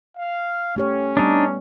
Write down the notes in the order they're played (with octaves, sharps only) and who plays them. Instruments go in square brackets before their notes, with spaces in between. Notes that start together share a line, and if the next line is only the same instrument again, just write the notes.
[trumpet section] F5
[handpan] A3 G4 C#5 [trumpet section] C#4
[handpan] G3 B3 [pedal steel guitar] D4 D#4